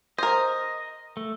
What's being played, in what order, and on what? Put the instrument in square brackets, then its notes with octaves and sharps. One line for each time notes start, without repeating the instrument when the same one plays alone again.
[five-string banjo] A#4 C5 [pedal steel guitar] D#5
[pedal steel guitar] A3